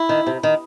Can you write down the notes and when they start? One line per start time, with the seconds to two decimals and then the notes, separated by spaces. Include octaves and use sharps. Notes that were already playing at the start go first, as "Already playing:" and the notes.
Already playing: E4
0.09 D#3
0.27 C3
0.43 D#3